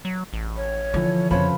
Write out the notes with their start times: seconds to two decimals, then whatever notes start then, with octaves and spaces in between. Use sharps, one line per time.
0.05 F#3
0.33 A1
0.57 C#5
0.94 D3 E3 F3
1.31 F2 C#3 F3 B4 C#5 B5